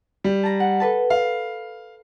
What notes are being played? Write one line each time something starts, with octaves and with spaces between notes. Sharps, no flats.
G3
A5 A#5
F#5
A4 B4 A5
F5